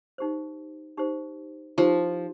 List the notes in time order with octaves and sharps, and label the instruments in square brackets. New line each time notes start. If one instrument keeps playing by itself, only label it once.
[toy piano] D#4 G4 C5
D#4 G4 C5
[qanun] F3 [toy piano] D#4 G4 C5